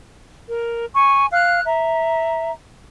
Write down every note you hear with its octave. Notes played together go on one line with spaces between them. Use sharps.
A#4
G#5 C#6
F5 F6 F#6
E5 A#5